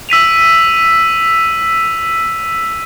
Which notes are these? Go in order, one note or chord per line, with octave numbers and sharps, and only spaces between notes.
E6 B6 D#7 F7